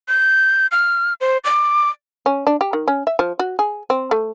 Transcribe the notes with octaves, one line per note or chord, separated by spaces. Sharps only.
G6
F6
C5
D6
C#4
D4
G4
D#3
C#4
E5
F3
F#4
G#4
C4
A3